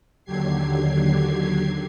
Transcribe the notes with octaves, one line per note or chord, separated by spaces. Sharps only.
D#2 D3 F#3 G4 G#6 C7